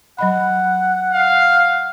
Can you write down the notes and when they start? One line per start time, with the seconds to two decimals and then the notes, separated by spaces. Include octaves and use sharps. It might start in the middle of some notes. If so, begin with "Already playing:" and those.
0.18 F#3 D#5 F#5 B5
1.14 F5